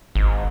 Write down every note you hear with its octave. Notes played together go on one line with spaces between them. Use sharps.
G#1